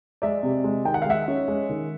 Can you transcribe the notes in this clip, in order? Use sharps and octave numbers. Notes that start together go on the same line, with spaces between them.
G#3 D5 E5
C3
G#3
D#3 G5
F#5
F5
G#3 E5 F#5
C#4
G#3
D#3